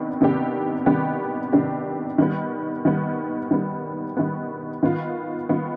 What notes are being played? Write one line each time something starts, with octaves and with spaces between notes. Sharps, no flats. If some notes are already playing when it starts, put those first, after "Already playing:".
Already playing: C3 D#3 B3 D4 G4
C3 D#3 B3 D4 G4
C3 D#3 B3 D4 G4
C3 D#3 B3 D4 G4
D#3 G3 B3
D#3 G3 B3
D#3 G3 B3
D#3 G3 B3
D#3 B3 F4
D#3 B3 F4